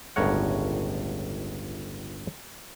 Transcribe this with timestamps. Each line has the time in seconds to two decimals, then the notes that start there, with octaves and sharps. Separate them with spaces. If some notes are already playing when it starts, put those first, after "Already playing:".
0.16 G1 C#2 A2 A#4 C#5 F#5